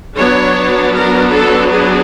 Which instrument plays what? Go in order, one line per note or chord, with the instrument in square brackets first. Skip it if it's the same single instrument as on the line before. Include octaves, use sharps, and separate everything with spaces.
[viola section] F#3 B3 D4 C#5
A#4
A4
G#4